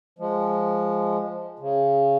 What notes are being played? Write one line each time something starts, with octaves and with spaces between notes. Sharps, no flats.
F3 G#3
C#3